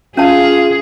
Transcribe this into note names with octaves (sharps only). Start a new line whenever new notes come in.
C#4 F4 G#4 F5 A5